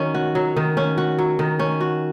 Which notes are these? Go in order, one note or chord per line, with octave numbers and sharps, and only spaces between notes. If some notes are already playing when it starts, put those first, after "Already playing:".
Already playing: D#3 F#3 C#4
F#4
F#3
D#3
C#4
F#4
F#3
D#3
C#4
F#4